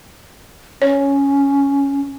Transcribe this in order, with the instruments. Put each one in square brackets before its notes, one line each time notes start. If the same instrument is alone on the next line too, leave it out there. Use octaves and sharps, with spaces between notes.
[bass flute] C#4 [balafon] C#5